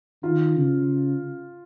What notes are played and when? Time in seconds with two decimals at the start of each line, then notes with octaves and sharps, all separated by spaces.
0.23 D#3 F4
0.56 C#3